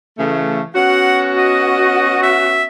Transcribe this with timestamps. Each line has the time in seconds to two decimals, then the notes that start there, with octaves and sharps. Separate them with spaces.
0.18 C#3 E3 A3
0.75 B3 C#4 F#4 F#5
1.38 D#5
2.23 E5